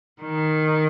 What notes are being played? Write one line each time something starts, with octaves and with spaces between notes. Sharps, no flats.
D#3